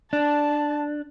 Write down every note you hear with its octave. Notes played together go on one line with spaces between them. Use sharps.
D4 A5